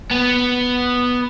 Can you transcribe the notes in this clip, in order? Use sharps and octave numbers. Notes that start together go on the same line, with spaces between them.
B3